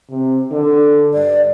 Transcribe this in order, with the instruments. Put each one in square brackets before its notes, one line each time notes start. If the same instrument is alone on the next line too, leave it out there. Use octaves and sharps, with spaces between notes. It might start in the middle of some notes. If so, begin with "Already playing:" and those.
[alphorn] C3
D3
[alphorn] G2 [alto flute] D5